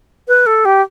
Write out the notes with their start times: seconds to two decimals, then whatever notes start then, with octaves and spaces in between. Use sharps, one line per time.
0.28 B4
0.46 A4
0.65 G4